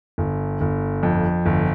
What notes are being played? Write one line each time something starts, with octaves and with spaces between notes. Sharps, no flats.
G1
G1
F2
G1